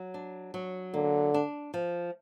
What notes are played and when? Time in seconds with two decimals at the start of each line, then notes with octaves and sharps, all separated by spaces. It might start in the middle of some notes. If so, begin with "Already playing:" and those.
Already playing: F#3
0.14 D4
0.54 F#3
0.94 D3 A#3
1.34 D4
1.74 F3